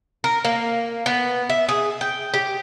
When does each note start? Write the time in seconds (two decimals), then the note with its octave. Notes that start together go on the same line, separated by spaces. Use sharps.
0.24 A#4
0.45 A#3
1.06 B3
1.50 E5
1.69 G#4
2.01 G5
2.34 G4